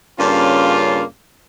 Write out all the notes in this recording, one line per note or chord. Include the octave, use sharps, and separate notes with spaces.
G2 C#3 A#3 C#4 F4